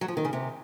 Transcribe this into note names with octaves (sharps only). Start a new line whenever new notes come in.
F#3
F3
D#3
C#3
C3